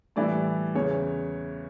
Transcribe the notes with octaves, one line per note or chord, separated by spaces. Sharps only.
A2 E3 G3 B3 E4 D5
E2 C#3 E3 C#5